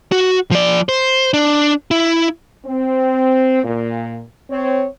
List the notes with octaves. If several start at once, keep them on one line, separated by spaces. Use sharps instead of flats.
F#4
F3 D5
C5
D4
E4
C4
A#2
C4 C#5